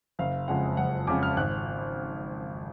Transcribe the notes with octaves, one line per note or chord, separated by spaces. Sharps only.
F#1 F5
F2 C#3 G#3 F#5
F#1 F#5
F2 C#3 G#3 D6
F6
G#1 F#6